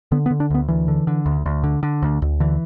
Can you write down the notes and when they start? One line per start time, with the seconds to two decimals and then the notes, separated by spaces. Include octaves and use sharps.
0.12 D3 B3
0.26 B3
0.31 D3
0.40 D4
0.50 D2 B3
0.68 D2 E3
0.88 D3
1.07 D3
1.26 D2
1.46 D2
1.64 D3
1.83 D3
2.03 D2
2.22 D2
2.40 D3 E3